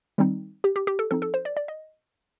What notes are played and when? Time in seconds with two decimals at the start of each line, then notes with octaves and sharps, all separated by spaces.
0.18 D#3 G3 C4 D#4
0.64 G4
0.76 G4
0.87 G4
0.99 A4
1.11 F3 C4 D#4 A4
1.22 A4
1.34 C5
1.45 D5
1.57 D5
1.68 D#5